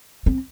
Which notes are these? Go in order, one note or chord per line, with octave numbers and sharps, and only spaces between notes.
C4